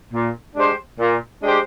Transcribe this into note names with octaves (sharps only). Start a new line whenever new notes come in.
A#2
G#3 D4 G4 C5
A#2
G#3 D4 G4 C5